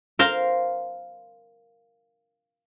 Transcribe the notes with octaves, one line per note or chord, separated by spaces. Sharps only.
A#4 C5 F5 A#5